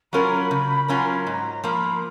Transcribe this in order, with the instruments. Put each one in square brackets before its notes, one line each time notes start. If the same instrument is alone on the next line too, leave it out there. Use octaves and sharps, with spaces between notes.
[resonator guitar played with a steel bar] F#3 C#4 F4 A#4 [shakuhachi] B5
[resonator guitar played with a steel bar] C#3
F#3 C#4 F4 A#4
[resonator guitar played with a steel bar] G#2 [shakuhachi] A#5
[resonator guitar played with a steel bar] F3 A#3 [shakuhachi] B5